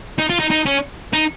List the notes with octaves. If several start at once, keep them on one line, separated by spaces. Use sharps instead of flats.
D#4
F4
D#4
D#4
C#4
D#4